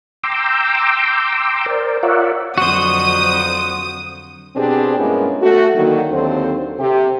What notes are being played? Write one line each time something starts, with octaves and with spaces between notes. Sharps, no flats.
G5 A#5 C6 D6 E6
A#4 C5 D5
F4 A#4 C#5 D5 E5 F#5
F2 D3 F#3 F#4 C5 D#6
B2 C4 D4 G4 G#4 D5
G2 G#3 A#3 B3 C#4 E4
A3 F#4
D3 D#3 F#3 A#3
D#2 D3 F#3 C4 A4 C5
C3 G4